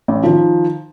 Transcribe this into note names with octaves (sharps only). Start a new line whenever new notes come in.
A1
D#3 F3